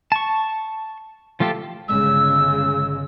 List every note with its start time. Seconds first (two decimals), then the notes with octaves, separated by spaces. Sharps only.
0.12 A5 C#6
1.40 F3 A3 F4 G4 A4
1.88 G1 C#3 G#3 E6